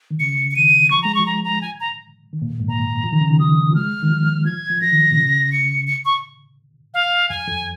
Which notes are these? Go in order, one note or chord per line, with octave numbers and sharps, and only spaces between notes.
D#3
C#3 C#7
C#7
D#3 D#7
F3 C#6
G#3 A#5
F3 C#6
A#5
A#5
G#5
A#5
D#3
A#2
F2
G#2
A#2 A#5
F3
D#3
C#3
D#3
F3 D#6
F3
G#3 F6
D#3
F3
F3 G#6
F3
F3 A#6
D#3
F3
A#2
C#3
C#7
C#7
C#6
F5
F2 G#5
F2